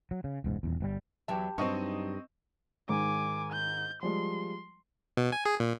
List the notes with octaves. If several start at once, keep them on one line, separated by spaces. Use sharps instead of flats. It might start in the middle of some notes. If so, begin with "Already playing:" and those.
F#3
C#3
E1 C#2 G#2
D#1 E2
G1 B2 G3
E2 F#3 E4 G4 E5 A5
G2 F#3 C4 D#4 D#5 C#6
G#2 D#3 G#5 D6
G6
F3 G3 G#3 C6
B2
G#5
G#4
A#2